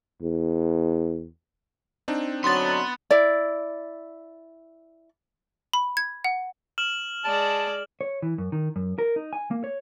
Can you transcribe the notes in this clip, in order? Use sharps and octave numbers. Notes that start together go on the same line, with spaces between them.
E2
C4 D4 D#4
D3 F#3 B3 C6 A6
E4 D5
B5
G#6
F#5
F6 E7 F#7
G#3 D5 A5
C#5
E3
F#2
D#3
F#2
A#4
D#4
G#5
A#3
C#5